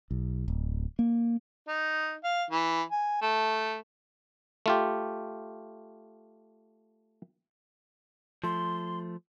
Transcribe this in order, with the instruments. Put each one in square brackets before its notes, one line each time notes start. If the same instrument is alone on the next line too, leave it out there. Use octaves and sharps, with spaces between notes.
[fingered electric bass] B1
D1
A#3
[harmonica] D#4
F5
E3
G#5
A3
[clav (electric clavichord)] A3 F4 G4
[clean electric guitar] F3 A3 [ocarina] C6